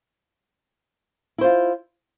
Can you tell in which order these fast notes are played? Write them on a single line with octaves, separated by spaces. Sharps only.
E4 C5 F4